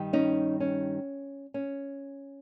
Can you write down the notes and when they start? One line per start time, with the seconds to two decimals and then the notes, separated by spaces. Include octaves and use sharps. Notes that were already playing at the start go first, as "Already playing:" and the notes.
Already playing: G2 D#3 G3
0.13 C#4 D#4
0.60 C#4
1.54 C#4